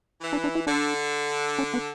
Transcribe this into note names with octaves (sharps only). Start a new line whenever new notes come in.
E3
D4
D4
E4
D3 D4
C#4
B3